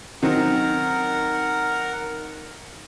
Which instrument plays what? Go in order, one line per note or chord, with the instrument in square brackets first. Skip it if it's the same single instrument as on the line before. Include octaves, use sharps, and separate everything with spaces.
[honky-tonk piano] D#3 F#3 C4 [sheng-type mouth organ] A#4 F#5